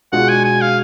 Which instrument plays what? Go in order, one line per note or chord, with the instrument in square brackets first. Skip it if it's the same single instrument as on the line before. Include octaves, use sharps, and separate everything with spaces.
[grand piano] B2 G#3 D4 F4 [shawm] F#5
[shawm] G#5
G#5
F5